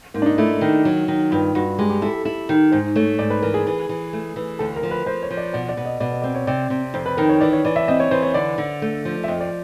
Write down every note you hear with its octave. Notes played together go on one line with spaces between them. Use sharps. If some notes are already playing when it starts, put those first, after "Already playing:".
G#2 A#3
D4
D#4
A3 E4
D#3
F#3
D#3
G2 F4
G2 F#4
G#3 G4
G4
E4 A4
A4
E4 A4
D#3
G#2 C5
A3 C#5
G#2 D5
B4
E3 A#4
G#4
E3
E3
A3
E3
D2 A4
A#4
F3
B4
F3 C5
C#5
F3
D5
B2 D5
D5
B2
D#5
B2 D5
D#5
C4 D5
C#5
C3 D5
C3
F2 C5
B4
D#3 A#4
C#5
E3 D5
C#5
E3 D5
E5
C4 D#5
C#5
E3 C5
C#5
D3 D5
D3
A3
F3
E5
F2 D#5
D5